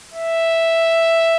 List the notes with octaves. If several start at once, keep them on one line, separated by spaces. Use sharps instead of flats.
E5